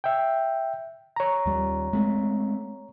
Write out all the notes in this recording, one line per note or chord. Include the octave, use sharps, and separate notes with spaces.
E5 G5
C#5 A#5
D#2 G3
G#3 A3 C4